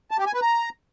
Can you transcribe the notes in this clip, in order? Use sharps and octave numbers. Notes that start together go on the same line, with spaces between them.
A5
G4
G#5
B4
A#5